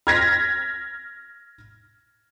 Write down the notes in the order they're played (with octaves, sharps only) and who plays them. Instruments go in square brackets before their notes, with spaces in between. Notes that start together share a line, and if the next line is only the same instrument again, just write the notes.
[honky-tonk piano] F6 G#6 A#6 B6